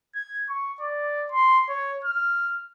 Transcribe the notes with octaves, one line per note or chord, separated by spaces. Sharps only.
G#6
C#6
D5
C6
C#5
F6